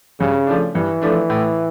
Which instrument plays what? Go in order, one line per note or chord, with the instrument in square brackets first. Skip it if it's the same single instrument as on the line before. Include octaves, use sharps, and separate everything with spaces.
[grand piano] G2 [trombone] C#3
[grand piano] F3 A3 D4
[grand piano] G2 [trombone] E3
[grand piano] F3 A3 D4
A2